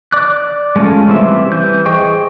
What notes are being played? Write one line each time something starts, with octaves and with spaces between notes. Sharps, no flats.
D5 D6 F#6
G#3 A3 C#4 F4
E3 G3 C4 E5
E3 G6
G#4 C5 D#5 G5 C#6